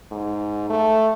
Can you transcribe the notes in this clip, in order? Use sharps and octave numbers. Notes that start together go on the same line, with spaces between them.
G#2
A3